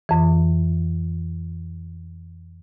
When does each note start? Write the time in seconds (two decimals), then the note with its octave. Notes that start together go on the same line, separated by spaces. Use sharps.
0.09 F2 E3